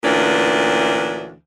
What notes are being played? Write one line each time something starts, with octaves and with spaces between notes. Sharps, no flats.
D2 A#2 E3 C#4 D4